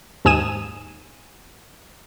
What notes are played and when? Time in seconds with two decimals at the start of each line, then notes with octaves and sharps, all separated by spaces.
0.25 D#2 G#2 G#5 D#6 D#7 E7